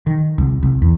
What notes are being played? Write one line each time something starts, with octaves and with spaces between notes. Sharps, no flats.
D#3
C2
C2
E2